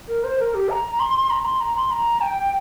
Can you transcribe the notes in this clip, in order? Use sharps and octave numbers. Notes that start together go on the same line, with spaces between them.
A#4
C5
A#4
G4
A#5
C6
A#5
C6
A#5
C6
A#5
G5